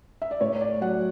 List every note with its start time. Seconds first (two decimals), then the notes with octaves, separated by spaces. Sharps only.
0.22 E5
0.31 D5
0.41 A2 C#5
0.61 D5
0.81 F#3 F#5